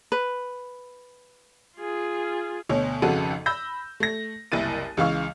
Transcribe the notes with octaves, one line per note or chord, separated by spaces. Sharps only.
B4
F4 G#4
D2 B2 C#5
G#1 F2 C#3 F#4 A4 D#7
B5 E6 G6 A#6
A3 A#6
F#1 C2 E4 A6 D#7
C#2 C#3 E3 F5 C#6 F6